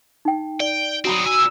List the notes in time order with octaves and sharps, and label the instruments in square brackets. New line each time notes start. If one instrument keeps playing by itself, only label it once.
[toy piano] D#4 G5
[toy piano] D5 [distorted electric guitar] G5
[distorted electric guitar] F#3 C4 [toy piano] F#4 A#5 B5 [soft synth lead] D#6
[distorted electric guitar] A#2 G#5 [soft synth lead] E6